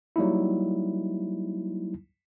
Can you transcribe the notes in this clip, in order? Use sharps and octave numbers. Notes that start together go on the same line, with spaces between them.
F#3 G3 A#3 D#4 E4